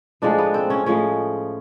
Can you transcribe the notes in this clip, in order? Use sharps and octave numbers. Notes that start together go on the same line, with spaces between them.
A2 F3 G#3 D4
B3
C4
C#4
A2 F3 G#3 C#4